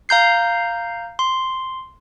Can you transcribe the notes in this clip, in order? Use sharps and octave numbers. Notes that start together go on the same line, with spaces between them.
F5 A#5 G6 C7
C6